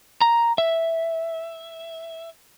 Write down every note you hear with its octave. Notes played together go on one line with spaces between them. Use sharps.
A#5
E5